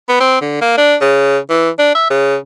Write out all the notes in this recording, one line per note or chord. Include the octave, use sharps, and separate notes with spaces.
B3
C4
D3
A#3
D4
C#3
E3
D4
E5
C#3